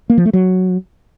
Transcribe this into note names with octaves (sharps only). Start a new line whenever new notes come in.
A#3
F3
A3
F#3